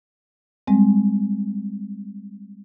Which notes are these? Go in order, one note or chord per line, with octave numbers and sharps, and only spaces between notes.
G3 G#3 C4